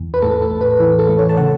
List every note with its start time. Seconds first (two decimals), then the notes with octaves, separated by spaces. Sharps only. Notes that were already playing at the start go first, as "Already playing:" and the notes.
Already playing: E2
0.14 B4
0.22 A2 A4
0.42 A4
0.51 A1
0.61 B4
0.79 E3 B4
0.99 A4
1.09 A3
1.19 C#5
1.29 A5
1.37 C#3 F#5